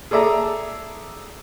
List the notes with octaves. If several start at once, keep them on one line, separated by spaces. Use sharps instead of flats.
G#4 A4 D5 E5 A#5